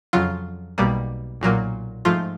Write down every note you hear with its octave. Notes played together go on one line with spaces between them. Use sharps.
F2 C#3 F#3 F4
B1 B2 G3 A#3
B1 A#2 F#3 A#3
G#2 F3 A3 F4